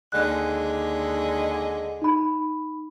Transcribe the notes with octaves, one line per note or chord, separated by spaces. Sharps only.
D#2 D3 G#3 F#6
D#4 B5